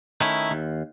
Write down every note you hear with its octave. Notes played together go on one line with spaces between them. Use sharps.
D#3 A3 C#4 E4
D#2